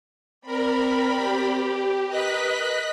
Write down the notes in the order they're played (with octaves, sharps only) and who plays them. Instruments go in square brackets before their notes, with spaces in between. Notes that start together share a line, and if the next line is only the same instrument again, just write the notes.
[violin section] C4 D5 B5 [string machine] A#4
[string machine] G4
[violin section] A#4 B4 [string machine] D#5 F#6 B6